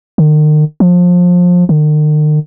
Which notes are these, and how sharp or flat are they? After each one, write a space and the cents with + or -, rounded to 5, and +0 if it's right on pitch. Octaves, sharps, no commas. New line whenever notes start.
D#3 -40
F3 +25
D#3 -45